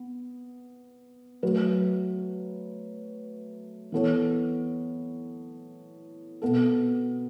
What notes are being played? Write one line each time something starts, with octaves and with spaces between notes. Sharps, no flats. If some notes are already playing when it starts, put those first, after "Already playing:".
Already playing: B3
F#3 A3 F#4 B4
E3 B3 A4 C#5
B2 B3 A4